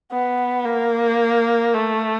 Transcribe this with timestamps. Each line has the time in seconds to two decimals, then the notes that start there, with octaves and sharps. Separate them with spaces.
0.12 B3
0.65 A#3
1.74 A3